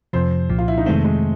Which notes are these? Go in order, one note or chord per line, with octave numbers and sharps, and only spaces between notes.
F2 C3 F3 C5
C2 A#2 F3
F4
E4
D#4
F2 C3 D#3 G#3 A3 C4
G#3